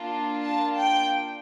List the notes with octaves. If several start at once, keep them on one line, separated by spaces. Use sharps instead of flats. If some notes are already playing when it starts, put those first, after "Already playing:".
Already playing: A#3 D4 F4
A5
G5